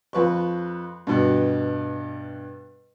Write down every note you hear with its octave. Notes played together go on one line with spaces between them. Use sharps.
F2 B4 C#6
G2 B2